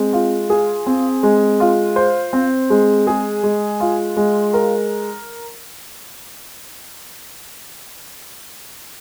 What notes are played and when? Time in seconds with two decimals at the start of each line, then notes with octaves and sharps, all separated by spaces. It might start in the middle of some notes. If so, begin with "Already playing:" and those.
Already playing: G#3 C4
0.13 F4
0.50 G#4
0.86 C4
1.23 G#3
1.60 F4
1.96 C5
2.33 C4
2.70 G#3
3.07 G#4
3.43 G#3
3.80 F4
4.17 G#3
4.54 A#4